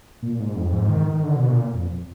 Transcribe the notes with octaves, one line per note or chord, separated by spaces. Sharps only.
A#2
G#2
F2
G#2
D#3
D#3
D3
B2
A#2
F2